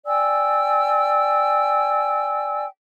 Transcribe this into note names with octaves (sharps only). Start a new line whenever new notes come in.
D5 G5 G#5 E6